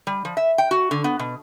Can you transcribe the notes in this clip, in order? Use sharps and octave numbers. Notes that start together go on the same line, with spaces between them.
G3
F3
E5
G5
F#4
D3
B3
B2